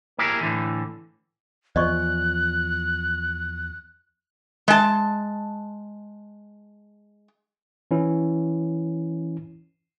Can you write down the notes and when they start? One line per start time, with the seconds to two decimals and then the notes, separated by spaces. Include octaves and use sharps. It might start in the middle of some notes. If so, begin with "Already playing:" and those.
0.19 A#3 E4 G4 G#4 A#4
0.41 A2 D3 E3
1.76 E2 F3 D5 D#5 C#6 F#6
4.68 G#3 A5
7.91 E3 C#4 E4